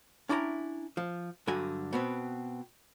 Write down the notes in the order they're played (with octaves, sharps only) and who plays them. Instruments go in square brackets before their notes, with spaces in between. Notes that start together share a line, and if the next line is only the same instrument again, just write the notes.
[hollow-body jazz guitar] C#4 D4 E4 G5 A5 A#5
F3
G2 D3 F#3 F#4 G#5
B2 B3 C4